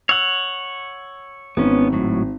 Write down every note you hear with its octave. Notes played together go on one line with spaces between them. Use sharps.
C#5 F#5 E6
G#1 B3 C#4
A2 F#3